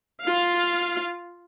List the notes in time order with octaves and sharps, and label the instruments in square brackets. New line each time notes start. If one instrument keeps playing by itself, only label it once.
[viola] F4 F5